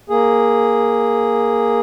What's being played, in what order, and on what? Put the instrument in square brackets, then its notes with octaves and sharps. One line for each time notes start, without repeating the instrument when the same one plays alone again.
[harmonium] A#3 G#4